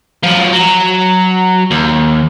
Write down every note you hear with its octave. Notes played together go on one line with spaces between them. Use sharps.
F3 F#3
F#3
D#2